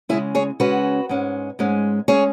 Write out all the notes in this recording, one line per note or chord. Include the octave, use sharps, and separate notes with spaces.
C#3 G#3 C#4 E4 G#4
G#4 C#5
C#3 G#3 C#4 F#4 B4
G#2 G#3 C#4
G#2 G#3 C#4
G#3 C#4 G#4 C#5